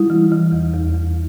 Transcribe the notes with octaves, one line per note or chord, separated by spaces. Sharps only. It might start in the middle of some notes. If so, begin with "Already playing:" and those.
Already playing: G3 E4
E3
E3
E2
E2
E2